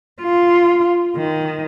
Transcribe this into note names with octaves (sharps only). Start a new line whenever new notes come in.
F4
D#3